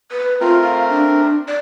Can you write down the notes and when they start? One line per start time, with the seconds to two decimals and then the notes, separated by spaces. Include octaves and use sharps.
0.11 B4
0.41 A3 C4 F4 A#4
0.62 F5
0.90 D4
1.48 D5